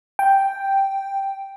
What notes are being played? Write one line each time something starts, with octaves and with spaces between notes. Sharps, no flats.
G5